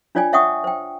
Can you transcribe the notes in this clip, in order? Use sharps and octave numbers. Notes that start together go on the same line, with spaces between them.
D4 F4 C#5 D5 G5 G#5
C#5 E5 F#5 G5 C#6 D#6
C5 G5